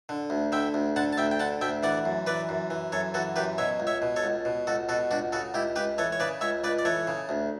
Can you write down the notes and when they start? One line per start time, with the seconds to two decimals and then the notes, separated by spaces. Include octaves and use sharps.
0.09 D3
0.30 D2
0.52 D3 E5 G5
0.74 D2
0.96 D3 F#5 A5
1.13 A5
1.17 D2 E5 G5
1.31 G5
1.40 D3 F#5 A5
1.61 D2 E5 G5
1.83 E3 D5 F#5
2.05 F#2
2.27 E3 B4 D5
2.49 F#2
2.70 E3
2.92 F#2 A4 C#5
3.14 E3 F#4 A4
3.36 F#2 G4 B4
3.58 B2 C#5 E5
3.80 C#2
3.87 C#5 E5
4.02 B2
4.16 A4 C#5
4.24 C#2
4.45 B2
4.67 C#2 F#4 A4
4.89 B2 F#4 A4
5.11 C#2 D4 F#4
5.32 C#3 F#4 A4
5.54 C#2 E4 G4
5.76 C#2 G4 B4
5.98 E3 A4 C#5
6.12 C#5
6.20 C#3 B4 D5
6.41 C#2 C#5 E5
6.64 C#2 B4 D5
6.79 D5
6.85 E3 A4 C#5
7.07 C#3
7.29 D2